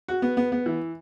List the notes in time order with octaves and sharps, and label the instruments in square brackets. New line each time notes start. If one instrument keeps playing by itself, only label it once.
[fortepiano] F#4
B3
B3
B3
E3